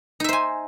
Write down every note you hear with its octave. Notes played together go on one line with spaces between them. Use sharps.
D#4 C5 E5 G#5